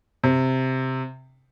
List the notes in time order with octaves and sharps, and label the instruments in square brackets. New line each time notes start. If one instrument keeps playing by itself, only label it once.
[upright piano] C3